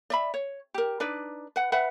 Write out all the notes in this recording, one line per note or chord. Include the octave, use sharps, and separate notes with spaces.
D5 E5 B5
C#5
G4 A#4
D4 D#4 B4 D5
B4 F#5
B4 E5 F#5 B5